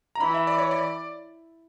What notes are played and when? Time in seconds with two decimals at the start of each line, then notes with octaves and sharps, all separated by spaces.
0.15 A#5
0.20 E3 B5
0.34 E5
0.47 D5
0.58 C#5
0.71 D5